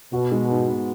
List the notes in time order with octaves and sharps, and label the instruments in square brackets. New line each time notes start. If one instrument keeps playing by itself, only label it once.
[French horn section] B2 [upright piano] F#4
[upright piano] G#3
G#2
B3